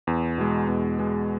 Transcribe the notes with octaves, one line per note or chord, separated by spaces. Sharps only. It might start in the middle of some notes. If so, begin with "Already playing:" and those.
E2
B2 G#3
E2
B2 G#3